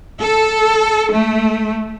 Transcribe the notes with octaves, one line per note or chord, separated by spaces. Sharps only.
A4
A3